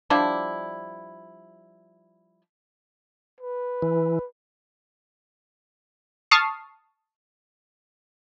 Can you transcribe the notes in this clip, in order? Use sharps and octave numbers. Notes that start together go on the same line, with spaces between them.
F3 G3 D4 E4
B4
E3
A5 C#6 D#6 F6 C7